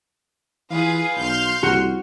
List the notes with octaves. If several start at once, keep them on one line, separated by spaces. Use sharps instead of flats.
E3 F4 G#4 B4 F5
B1 C6 F6 G6
C2 F#4